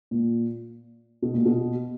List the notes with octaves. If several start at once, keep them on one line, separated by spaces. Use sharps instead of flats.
A#2
B2
A#2
B2